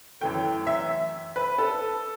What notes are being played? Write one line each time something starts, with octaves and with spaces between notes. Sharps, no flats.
F#2 E3 A3 G5
E5
B4
A4